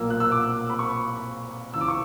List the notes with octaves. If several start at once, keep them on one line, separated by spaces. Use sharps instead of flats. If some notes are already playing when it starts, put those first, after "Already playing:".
Already playing: B1 A#2 A#3 E6
F#6
E6
D6
B5
C#6
C#2 C#3 E3 E6
D6
C#6